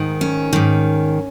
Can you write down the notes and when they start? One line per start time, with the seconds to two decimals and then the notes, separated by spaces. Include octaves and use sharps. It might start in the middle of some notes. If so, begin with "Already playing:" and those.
Already playing: G#2 D#3
0.21 C#4
0.53 G#2 D#3